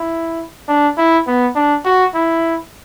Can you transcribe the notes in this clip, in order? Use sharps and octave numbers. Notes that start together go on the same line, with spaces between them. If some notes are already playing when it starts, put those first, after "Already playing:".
Already playing: E4
D4
E4
B3
D4
F#4
E4